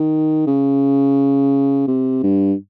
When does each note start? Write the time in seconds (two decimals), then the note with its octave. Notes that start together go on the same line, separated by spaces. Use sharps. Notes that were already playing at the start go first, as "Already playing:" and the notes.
Already playing: D#3
0.47 C#3
1.88 C3
2.23 G2